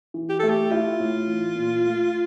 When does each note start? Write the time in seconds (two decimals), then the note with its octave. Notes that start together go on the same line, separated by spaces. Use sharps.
0.14 E3
0.29 G4
0.39 A3 A4
0.49 G4
0.71 E4 F4
1.00 A2
1.27 E3
1.55 A#2
1.84 A3